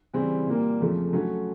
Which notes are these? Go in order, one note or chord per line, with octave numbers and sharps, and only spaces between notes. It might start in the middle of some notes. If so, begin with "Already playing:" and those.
C#3 E3 G3 C4 E4
A#2 G3 A#3
F2 C#3 F3 A3
F#3 A3 C#4